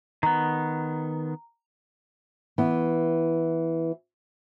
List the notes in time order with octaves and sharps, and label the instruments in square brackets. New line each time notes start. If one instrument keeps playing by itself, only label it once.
[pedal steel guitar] D#3 B3 [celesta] A#5
[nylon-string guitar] E3 B3